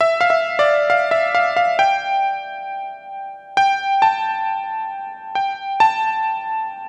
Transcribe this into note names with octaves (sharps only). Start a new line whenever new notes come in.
E5
F5
E5
D5
F5
E5
F5
F5
G5
G5
A5
G5
A5